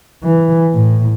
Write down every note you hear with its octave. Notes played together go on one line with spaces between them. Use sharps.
E3
A2